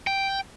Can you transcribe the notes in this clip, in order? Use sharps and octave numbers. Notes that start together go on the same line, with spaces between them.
G5